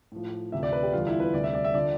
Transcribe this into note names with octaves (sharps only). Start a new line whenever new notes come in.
A2 F3
D2 C3 F3 E5
D5
B4
G4
E2 D3 G3 F4
E4
B4
D2 C3 E3 G3 D5
E5
D5
E5
D3 F3 D5